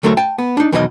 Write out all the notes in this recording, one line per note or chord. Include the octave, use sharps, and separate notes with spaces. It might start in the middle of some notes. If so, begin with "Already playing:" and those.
D2 F#3 A3 A#4 C5 C#5
G5 A5
B3
D4 D#4
E2 B2 D#3 F#3 G4 D#5